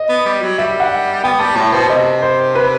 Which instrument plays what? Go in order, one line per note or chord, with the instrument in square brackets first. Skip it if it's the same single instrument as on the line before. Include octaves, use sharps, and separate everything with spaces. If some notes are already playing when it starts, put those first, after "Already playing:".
Already playing: [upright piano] D#5
[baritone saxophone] B3
G3
F#3
[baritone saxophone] G3 [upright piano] E5
[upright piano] F#5
[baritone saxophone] B3 [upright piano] G5
[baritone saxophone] G3 [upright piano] A5
[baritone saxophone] A2 [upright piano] A5
[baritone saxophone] B2 [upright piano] C5
[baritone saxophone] C3 [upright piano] D#5
[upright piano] C5
B4